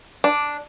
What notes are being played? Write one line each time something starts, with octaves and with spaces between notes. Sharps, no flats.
D4